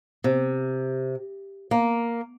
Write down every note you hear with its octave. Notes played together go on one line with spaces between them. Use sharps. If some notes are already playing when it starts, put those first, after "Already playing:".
C3
A#3